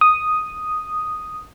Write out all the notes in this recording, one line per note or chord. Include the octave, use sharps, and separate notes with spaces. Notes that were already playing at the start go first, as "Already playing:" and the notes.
D#6